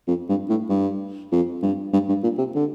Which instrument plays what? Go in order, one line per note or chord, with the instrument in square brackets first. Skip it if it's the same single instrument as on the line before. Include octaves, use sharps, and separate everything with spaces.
[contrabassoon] F2
G2
A2
G2
F2
G2
G2
G2
A#2
C3
D3